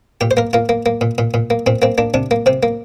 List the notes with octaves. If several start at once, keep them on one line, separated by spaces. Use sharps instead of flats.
A#2 G4
C5
A#3 A#4
A#3 F4
A#3
A#3
A#2
A#2
A#2
A#3
A#2 C4
A#3 C4
A#3 D4
C3 D4
A#3
C3 C4
A#3